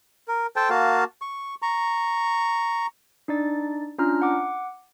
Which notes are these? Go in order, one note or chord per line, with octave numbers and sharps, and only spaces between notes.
A#4
A4 C5 G5 A5
A#3 F#4 F5 A5
C#6
A#5 C#6
D4 D#4 D5 A6
C#4 D4 F4 A#5 F6
F#5 D6